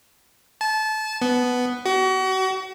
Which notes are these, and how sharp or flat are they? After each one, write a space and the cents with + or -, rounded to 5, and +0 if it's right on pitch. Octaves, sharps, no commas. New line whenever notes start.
A5 -25
B3 +5
F#4 +35